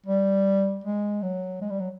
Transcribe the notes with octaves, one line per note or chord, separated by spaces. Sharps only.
G3
G#3
F#3
G#3
G3
F#3